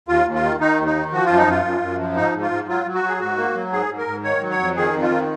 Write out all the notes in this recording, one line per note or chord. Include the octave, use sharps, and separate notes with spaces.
D#2 F4
D#2
F4
D#3
D#3 D#4
D#2
D#4
D#3
F3 F#4
F#2 F4
D#4
F#2 F4
F#2
F#2
F3
G#2 D#4
G#2
F4
G#2
F#3 F4
F#3
F#4
F#3
G#4
G#2 F#4
A#3
F#3
G#2 G#4
G#2
A#4
G#2
D#3 C#5
F#3
C#5
F2
D#3 G#4
F2
F4
D#3